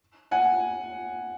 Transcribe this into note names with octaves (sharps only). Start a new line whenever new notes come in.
F#5 G#5